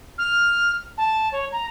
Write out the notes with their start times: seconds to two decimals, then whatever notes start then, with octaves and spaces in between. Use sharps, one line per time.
0.18 F6
0.98 A5
1.32 C#5
1.52 A#5